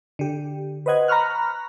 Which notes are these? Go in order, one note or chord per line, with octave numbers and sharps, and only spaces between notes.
D3 G4
B4 C5 D#5 F#5 G#6
A#5 B5 C#6 F6 F#6